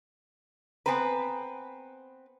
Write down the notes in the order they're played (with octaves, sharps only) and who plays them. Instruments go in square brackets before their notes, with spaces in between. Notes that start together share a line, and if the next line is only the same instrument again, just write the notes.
[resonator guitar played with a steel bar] B3 C4 B4 [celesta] G#5 A#5